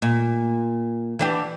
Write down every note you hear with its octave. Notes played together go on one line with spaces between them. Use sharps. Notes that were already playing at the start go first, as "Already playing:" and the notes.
A#2
E3 D4 G4